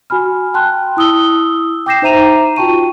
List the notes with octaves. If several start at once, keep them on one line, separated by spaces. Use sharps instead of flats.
F#4 G#5 B5 F6
G5 A5 C6 F#6
E4 D#6 E6 G7
G5 D6 G6 A#6 C7 E7
D#4 C5 E5 A#5 D#7 F7
F4 F#4 G5 A5 C#6 D#7